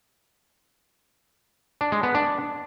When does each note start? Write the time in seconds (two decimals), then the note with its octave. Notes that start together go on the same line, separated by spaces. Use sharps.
1.81 D4
1.92 G#3
2.03 B3
2.14 D4